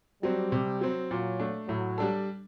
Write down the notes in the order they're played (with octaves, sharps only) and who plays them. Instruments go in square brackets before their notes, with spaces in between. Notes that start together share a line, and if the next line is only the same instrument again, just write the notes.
[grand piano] F#3 C4 [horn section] G3
[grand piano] C3
F#3 C4
[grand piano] A#2 [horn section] F#3
[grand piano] A3 D4
[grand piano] A2 [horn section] F#3
[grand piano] G3 D4 A4